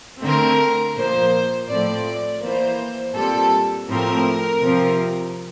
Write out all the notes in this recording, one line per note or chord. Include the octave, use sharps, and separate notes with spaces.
D3 A3 C4 A#4
A#2 F3 A#3 C5
A2 F3 A3 C4 D5
E3 A#3 C5
A#2 G3 C4 A4
A2 F3 A3 C4 A#4
C3 F3 C4